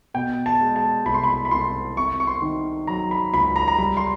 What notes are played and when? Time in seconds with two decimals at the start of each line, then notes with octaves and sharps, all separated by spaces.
0.14 B2 G5
0.46 A5
0.61 G#3
0.76 A5
1.06 C2 B5
1.14 C6
1.24 B5
1.45 B5
1.51 C2 C6
1.97 C3 C#6
2.20 C#6
2.27 C6
2.42 D#3
2.87 F#3 A#5
3.11 B5
3.34 C#2 B5
3.56 A#5
3.68 A#5
3.78 G3 B5
3.97 C6